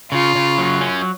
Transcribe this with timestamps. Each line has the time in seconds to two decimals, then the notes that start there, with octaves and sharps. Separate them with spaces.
0.12 C#3 F4
0.35 C#3
0.58 F#3
0.81 C#4